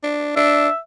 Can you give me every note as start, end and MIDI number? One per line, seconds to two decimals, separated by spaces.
0.04 0.32 62
0.37 0.68 62
0.37 0.78 76